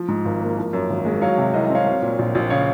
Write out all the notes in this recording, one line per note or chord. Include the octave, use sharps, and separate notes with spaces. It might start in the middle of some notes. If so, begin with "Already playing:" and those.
Already playing: F3
G#2
G#1
A#3
F3
F#2
G#1
G#3
F#3 C#5 F5
C3
C2 D#5
D#5
C4 C#5 F5
F#3
A#2
A#1
A#1
C#3 C#5 F5